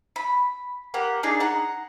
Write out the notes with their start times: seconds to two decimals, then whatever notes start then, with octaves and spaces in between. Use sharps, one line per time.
0.16 B5
0.94 A#3 G4 F#5
1.23 D4 D#4 G#4 D5
1.40 F#5 A#5